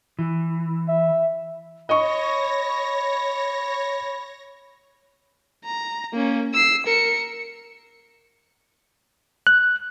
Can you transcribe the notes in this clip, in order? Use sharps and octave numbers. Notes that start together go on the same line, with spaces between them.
E3
E5
C#5 D#5 B5 C#6 A#6
A#5
A#3 C#4
E6 C7
A#4 C#7
F#6